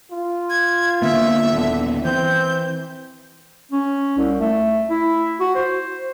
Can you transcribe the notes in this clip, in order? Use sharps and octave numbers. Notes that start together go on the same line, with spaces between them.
F4
G#6
D3 A#3 B3 E5
D#1 D3 B3
E3 C4 G6
C#4
C2
A3
E4
F#4
C5